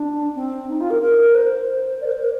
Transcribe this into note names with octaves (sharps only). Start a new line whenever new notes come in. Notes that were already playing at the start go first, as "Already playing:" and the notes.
Already playing: D4
C4
D#4
F4
A#4
A#4
C5
D5
A#4
C5
A#4